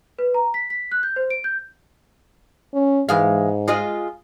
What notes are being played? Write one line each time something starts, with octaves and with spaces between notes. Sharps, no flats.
B4
A#5
B6
B6
F#6
G6
C5
D7
G6
C#4
G#2 E3 G#3 F5
G#3 F4 D#5